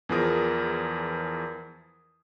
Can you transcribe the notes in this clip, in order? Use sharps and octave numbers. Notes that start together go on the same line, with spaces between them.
E2 E3 F3 G#4 A#4 D#6